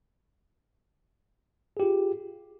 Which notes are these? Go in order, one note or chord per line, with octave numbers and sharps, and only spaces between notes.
F4 G4 G#4